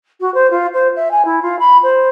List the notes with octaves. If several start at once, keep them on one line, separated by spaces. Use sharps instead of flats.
F#4
C5
F4
C5
E5
G#5
E4
F4
B5
C5